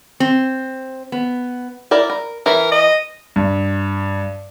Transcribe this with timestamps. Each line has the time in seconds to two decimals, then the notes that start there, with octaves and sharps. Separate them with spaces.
0.20 C4
1.12 B3
1.91 E4 A#4 D5
2.10 A#4
2.46 E3 E4 A#4 E5
2.72 D#5
3.36 G2